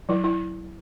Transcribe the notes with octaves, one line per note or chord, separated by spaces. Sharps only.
F#3 E4
E4